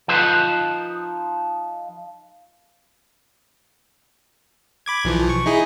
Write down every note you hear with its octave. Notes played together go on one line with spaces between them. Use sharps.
F3 D#4 B4 C5
B5 D6 G#6
B1 E3 F3
C#6
D#4 E4 G#4